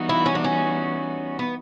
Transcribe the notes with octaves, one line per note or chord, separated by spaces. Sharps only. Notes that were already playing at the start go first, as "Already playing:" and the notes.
Already playing: E3 G3 B3 D#4 F#4
E4
C#4
D4
C#4
B3